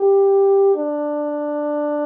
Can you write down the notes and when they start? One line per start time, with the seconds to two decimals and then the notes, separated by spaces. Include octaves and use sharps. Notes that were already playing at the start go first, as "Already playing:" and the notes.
Already playing: G4
0.75 D4